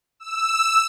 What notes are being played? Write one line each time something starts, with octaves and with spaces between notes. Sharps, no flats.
E6